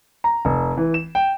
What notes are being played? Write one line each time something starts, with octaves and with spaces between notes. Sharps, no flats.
A#5
F1
E3
E7
G5